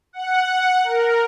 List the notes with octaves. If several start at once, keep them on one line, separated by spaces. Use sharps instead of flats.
F#5
A#4